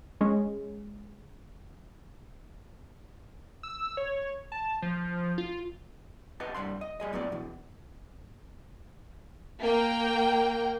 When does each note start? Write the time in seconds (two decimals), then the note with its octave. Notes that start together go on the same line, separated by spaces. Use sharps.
0.21 G#3 C#4
3.63 E6
3.97 C#5
4.52 A5
4.82 F3
5.38 F4
6.40 G4 B4 D#5 F#5 A5
6.54 C2 G2 G3 F#5 C6
6.81 D#5
7.00 G3 G#4 D#5
7.13 A2 F#3 B3 D5
7.32 B2 E3
9.62 A#3 G5